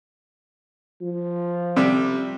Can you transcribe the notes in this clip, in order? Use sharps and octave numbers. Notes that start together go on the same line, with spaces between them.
F3
C3 G3